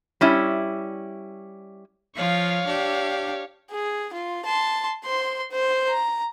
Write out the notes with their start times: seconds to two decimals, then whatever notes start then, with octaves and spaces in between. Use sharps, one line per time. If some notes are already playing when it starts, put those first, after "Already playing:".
0.21 G3 C#4 E4
2.16 F3 F4 C#5 F5
2.66 D4 G4
3.71 G#4
4.13 F4
4.45 A5 C6
5.04 C5 C6
5.51 C5
5.89 A#5